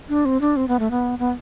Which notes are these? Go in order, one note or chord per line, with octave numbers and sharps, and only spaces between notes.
D4
C4
D4
C4
B3
A3
B3
B3